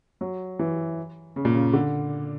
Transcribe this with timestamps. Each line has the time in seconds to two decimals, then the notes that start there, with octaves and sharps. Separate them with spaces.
0.21 F#3
0.59 E3
1.36 C#3
1.45 A#2
1.55 C#3
1.73 D3